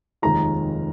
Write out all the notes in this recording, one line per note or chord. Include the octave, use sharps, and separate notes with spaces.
F1 D#2 D#3 G#3 F4 A#5